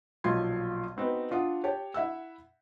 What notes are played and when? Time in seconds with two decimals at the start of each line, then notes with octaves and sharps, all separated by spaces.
0.24 B1 A#2 F3 F4 C6 G#6
0.97 B3 C4 D#4 F#4 B4
1.31 D4 F4 F#5 D#6
1.64 G4 C#5 G5 A5
1.94 E4 E5 F#5 E6